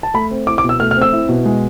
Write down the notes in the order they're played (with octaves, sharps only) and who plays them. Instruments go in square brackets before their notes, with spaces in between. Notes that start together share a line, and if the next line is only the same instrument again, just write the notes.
[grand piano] A5
A3 B5
C4
E4 D6
D6
B2
E6
A3 F6
F6
C4
E6
E4
B2
G#3